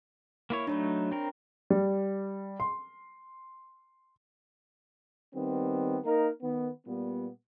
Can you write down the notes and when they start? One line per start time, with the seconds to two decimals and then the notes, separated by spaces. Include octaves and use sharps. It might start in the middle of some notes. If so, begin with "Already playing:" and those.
0.50 A#3 E4 C#5
0.67 F#3 A3 D4 D#4 C#5 B5
1.12 C4 A#4
1.70 G3
2.60 C6
5.35 D#3 G3 B3 C4
6.05 A#3 D#4 A#4
6.42 D#3 B3
6.87 A#2 G3 B3